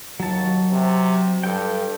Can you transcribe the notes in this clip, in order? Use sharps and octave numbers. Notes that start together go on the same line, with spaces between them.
D#2 F#3 A5
C3
G2 A4 G5